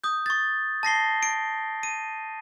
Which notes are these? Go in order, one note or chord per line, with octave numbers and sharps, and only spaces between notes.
D#6 G6
C#6 A6
A5 A#6 C7 G7
D7
D#7